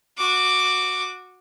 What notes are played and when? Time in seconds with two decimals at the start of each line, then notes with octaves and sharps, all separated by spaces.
0.18 F#4 D6